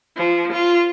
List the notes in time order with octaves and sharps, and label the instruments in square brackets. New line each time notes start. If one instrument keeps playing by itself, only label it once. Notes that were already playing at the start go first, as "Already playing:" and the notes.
[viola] F3
F4